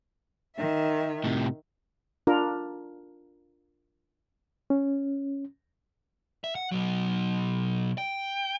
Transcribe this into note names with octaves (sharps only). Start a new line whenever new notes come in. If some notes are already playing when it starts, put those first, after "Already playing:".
D#3 E5
A2 C3
D4 F4 A#4
C#4
E5
F#5
B2 F#3
G5